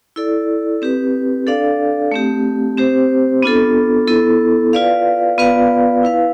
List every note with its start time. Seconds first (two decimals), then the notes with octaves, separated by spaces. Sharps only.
0.16 E4 A4 D5
0.82 C4 G4 B4
1.47 D4 A4 D5 F5
2.12 A3 C4 G4
2.77 C4 G4 C5
3.42 B3 D4 F4 A4
4.08 B3 E4 A4
4.73 F4 B4 D5 F5
5.38 B3 F4 B4 D5 F5
6.03 E4 B4 F5